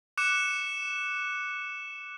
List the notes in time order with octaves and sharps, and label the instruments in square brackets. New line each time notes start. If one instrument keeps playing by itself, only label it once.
[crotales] D6 F#6 C#7 E7